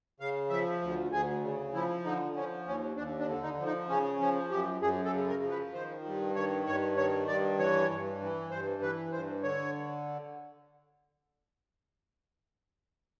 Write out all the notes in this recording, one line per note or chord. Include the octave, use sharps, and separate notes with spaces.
C#3 F5
F3 E5
D2
D2 G#4
C#3
F3 E4
D3 D#4
F3 C#4
D#2 C#4
D#2 D4
D4
D3
D#4
F3
D#4
C#3 C#4
F3 C#4
F#2 G4
F#2 G#4
A4
C#3
A#4
F3
B4
D#3 C5
G2
D#3 C#5
G2 C#5
D#3 C#5
G2 D5
E3 C#5
G2
E3
G2 C5
E3 B4
G2 C5
D3 C#5